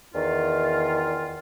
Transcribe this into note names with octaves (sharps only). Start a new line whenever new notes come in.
E2 D#3 F4